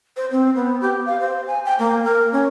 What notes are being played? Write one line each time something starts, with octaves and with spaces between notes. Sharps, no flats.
C5
C4
B3
G4
F5
C5
G#5
G5
A#3
A#4
C#4